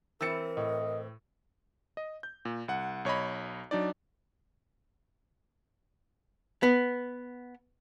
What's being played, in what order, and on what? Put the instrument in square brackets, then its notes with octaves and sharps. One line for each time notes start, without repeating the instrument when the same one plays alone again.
[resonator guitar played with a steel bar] E3 C4 [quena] A#4 [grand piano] E6 A6 C#7
[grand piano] A2 [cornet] D#5
[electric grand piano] D#5
G6
A#2
C2 F#5
B1 C#5 D#5 B5
F#3 D4 D#4 D5
[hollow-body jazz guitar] B3